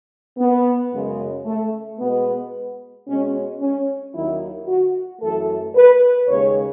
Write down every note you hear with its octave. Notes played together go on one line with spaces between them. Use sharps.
B3
F#2 C#3 G#3
A3
B2 G#3 B3
B2 G#3 C#4
C#4
D#2 D#3 F#3 E4
F#4
F#2 E3 A3 A4
B4
D#2 C#3 G#3 C#5